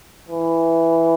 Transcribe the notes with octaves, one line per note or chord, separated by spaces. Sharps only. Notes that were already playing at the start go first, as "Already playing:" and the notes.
E3